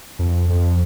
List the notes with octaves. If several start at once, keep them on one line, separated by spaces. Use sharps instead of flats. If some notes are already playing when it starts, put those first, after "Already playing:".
F2
F2